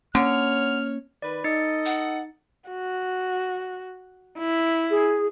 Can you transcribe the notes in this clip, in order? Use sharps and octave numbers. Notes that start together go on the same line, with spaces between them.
D3 A#3 C#4 C#5 F6
D#3 B4 D5
D#4 A4 D#5 A6 C#7
F#5
F#4
E4
G#4